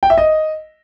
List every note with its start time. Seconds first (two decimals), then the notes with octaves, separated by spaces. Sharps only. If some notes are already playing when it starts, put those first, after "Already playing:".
0.03 G5
0.10 E5
0.18 D#5